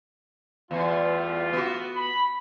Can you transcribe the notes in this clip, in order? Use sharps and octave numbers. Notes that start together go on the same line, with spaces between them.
E2 G3 A3 F4
B3 F#4
B5